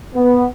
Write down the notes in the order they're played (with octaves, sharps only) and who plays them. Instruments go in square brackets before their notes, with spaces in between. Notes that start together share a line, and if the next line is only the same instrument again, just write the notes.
[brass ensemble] B3